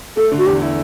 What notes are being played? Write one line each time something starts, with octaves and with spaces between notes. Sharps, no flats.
A3 A4
D3
F#4
E2 G4
E4